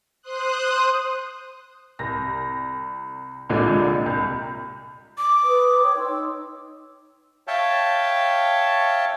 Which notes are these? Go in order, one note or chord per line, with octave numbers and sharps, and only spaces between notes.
C5 C6 D#6 F#6
C2 A#6
C2 A#2 D3 G#3
C2
D6
B4 D#6
C#5 G5 C#6
D#4 C6 E6
C#5 E5 F5 G5 A5